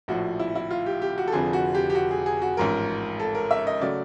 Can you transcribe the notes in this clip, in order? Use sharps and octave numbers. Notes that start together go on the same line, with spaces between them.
A#1 A2 F3 F#4
E4
E4
F4
G4
G4
F#4
A4
F1 F2 D3 F3 G#4
F#4
G4
G4
F#4
G#4
G#4
F#4
A1 G#2 F3 A#4
A4
A#4
E5
D#5
C#3 F#3 A3 D5